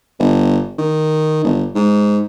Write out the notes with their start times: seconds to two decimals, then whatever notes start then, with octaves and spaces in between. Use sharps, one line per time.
0.19 G1
0.78 D#3
1.44 G1
1.75 G#2